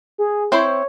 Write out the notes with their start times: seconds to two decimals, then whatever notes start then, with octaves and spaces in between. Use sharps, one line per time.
0.18 G#4
0.52 C4 E4 C5 C#5